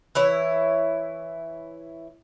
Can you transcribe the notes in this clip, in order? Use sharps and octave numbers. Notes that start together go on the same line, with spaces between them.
E3 E4 C#5